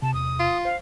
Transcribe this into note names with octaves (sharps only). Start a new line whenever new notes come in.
C3 A5
E2 C3 D#6
F4
C5 F5